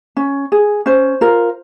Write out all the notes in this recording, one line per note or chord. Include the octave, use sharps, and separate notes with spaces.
C#4
G#4
C#4 C5
F4 A#4